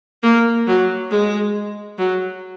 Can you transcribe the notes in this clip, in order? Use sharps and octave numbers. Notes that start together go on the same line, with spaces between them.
A#3
F#3
G#3
F#3